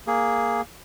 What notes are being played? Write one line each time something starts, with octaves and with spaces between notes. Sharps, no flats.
A#3 G#4